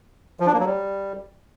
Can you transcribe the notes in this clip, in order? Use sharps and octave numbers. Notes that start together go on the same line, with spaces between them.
F3
D4
A#3
F#3
G3